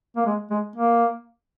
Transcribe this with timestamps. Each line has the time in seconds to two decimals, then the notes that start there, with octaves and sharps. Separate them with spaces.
0.16 A#3
0.26 G#3
0.51 G#3
0.76 A#3